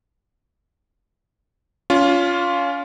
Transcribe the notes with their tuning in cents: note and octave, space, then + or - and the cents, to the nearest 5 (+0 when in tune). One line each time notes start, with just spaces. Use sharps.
C#4 +30 F4 +0